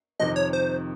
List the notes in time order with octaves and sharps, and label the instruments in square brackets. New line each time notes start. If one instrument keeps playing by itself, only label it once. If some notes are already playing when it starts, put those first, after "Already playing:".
[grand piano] F2 C3 D#3 [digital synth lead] D#5
[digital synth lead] C#5
C5